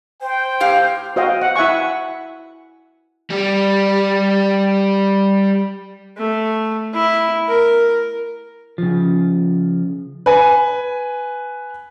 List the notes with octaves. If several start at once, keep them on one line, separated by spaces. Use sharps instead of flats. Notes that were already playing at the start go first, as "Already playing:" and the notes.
C5 G5
A2 G4 F5
F#4 C5 D#5 F5 G5
F#5
E4 E5 F#5 G#5 C#6
G3 G4
A3
E4
A#4
C#3 F3
B4 G#5